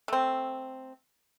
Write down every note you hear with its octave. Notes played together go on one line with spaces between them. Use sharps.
A3 C4